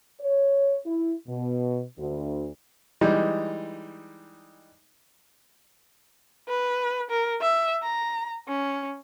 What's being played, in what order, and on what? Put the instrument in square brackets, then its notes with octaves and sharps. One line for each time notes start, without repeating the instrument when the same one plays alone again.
[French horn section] C#5
E4
B2
D2
[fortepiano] E3 G3 G#3 D#4
[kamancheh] B4
A#4
E5
A#5
C#4